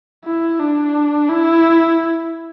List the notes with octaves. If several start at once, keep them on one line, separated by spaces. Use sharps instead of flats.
E4
D4
E4